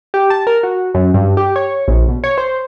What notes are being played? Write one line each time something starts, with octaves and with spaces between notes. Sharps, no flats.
G4
A5
A#4
F#4
F#2
G2
G4
C#5
A#1
B2
C#5
C5